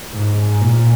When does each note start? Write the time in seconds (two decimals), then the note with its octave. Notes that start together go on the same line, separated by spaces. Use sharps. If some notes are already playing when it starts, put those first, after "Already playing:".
0.14 G#2
0.61 A#2